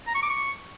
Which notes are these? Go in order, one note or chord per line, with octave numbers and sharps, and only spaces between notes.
A#5
C#6
D6
C#6